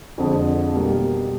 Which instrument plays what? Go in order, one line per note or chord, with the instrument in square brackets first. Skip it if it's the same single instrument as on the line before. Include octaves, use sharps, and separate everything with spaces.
[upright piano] F2 D3 F3 G#3
B2 G3 A#3